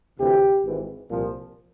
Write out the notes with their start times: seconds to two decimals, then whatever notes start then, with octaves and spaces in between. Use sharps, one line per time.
0.19 D2 C3 E3 G4
0.64 G#1 G#2 E3
1.09 C2 A#2 F3